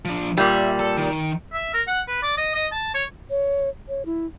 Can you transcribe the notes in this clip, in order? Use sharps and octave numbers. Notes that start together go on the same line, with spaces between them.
F3 D4
A#2 G3 E5
A4
D#3
E5
A#4
F#5
B4
D5
D#5
D#5
A5
C#5
C#5
C#5
E4